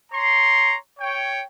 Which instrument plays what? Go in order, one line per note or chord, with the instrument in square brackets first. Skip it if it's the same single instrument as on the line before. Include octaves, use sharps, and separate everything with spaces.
[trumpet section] C#5 A#5 C6
C#5 G5